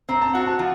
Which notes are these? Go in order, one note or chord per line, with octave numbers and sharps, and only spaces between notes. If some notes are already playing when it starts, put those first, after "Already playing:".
C4 A#5
A5
F#4 F#5
A5
F3